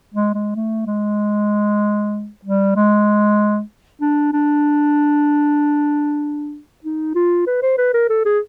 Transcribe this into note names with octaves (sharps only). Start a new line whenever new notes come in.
G#3
G#3
A3
G#3
G3
G#3
D4
D4
D#4
F4
B4
C5
B4
A#4
A4
G#4